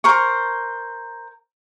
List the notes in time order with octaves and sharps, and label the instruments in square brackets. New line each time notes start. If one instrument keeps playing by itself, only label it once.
[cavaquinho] A#4 C5 C#6